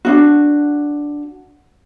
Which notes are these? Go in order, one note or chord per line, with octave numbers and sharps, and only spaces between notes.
D4 D#4 F#4